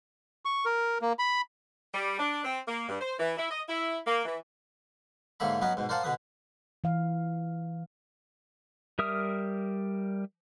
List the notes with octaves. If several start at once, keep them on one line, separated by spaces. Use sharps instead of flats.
C#6
A#4
A#3
B5
G3
D4
C4
A#3
G2
C5
E3
E4
D#5
E4
A#3
E3
G#2 D3 A#3 C#5 E5 B5
F#3 B3 C#4 B4 C#5 D#5
G#2 B2
A#4 C5 D5 F5 F#5 A5
B2 D3 B4 D#6
E3 F5
G3 A#4 E5 D#6 F6